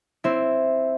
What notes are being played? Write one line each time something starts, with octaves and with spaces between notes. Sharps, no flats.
C4 E4